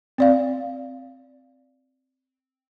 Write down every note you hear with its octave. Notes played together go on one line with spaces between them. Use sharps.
C4 D5 F5